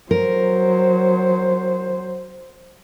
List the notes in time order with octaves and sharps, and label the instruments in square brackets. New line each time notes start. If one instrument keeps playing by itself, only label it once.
[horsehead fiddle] F#3 C5 [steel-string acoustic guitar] A#4